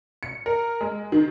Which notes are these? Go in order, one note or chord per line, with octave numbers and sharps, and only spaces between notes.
C#7
A#4
G#3
D#3